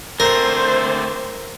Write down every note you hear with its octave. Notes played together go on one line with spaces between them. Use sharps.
D3 A3 C4 A#4 C5